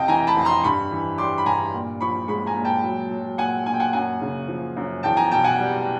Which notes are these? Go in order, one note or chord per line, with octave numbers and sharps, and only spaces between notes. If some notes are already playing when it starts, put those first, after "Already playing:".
Already playing: F2 C3 D#5 F5 G5 A5
E3 G#5 A#5
A5 B5
F2
A#5 C6
G2 B5 C#6
E3
G3 C6 D6
B5
G2 G#5 A#5
A#2
F3 B5 C#6
G#3 B5 C#6
G#5 A#5
A#2
G5 A5
F#3
F#3
A#2 F#5 G#5
A#2 G#5
G5
F#5 G#5
F#2 F#5 G#5
C#3
F3
F#2
E2 G5 A5
G#5 A#5
B2 G5 A5
F#5 G#5
G3